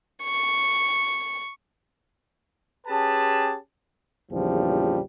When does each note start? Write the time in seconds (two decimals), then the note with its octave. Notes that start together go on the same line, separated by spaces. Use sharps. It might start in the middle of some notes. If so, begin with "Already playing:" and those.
0.23 C#6
2.87 C#4 G4 G#4 B4 A5
4.31 A#1 E2 C#3 F3 G3